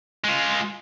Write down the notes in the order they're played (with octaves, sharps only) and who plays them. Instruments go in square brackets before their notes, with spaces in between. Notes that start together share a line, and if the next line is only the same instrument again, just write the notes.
[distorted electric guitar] G#3 F4